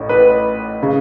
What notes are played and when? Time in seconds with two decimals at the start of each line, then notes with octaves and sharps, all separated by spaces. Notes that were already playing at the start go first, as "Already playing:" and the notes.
Already playing: A1 A2
0.09 B4
0.83 C#3